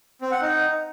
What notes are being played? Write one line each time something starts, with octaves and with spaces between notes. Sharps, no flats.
C4
F#5
D#4